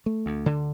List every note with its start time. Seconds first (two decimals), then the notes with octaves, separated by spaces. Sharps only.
0.06 A3
0.26 D2
0.46 D3